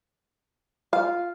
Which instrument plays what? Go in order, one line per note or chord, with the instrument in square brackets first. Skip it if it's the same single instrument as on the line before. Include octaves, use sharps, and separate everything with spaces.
[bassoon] F4 [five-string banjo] F5